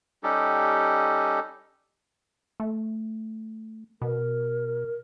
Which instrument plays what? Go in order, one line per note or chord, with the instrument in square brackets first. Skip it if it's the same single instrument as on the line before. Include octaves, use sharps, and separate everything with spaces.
[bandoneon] G3 C#4 D#4 G4 A4
[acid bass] A3
[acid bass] B2 [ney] A#4